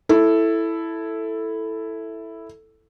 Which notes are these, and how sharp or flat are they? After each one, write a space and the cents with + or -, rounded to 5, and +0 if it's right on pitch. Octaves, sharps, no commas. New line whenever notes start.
E4 +0 A4 +0